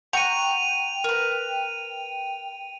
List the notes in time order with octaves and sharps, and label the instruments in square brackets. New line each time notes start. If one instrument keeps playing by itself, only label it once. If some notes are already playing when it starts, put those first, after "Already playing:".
[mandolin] F#5 A#5 C#6 [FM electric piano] G5 [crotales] D#7 F7
[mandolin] A#4 B4